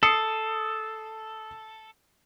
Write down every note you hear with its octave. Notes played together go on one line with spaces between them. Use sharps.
A4 D#6 C7 C#7